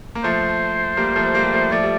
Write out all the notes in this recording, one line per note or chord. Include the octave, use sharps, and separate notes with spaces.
A#3
F3 A3 C5
G3 A#3
F3 A3
G3 A#3
G3
F3 A3
F3 A3 D5
G3